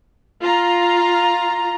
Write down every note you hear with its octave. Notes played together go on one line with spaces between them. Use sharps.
F4 A#5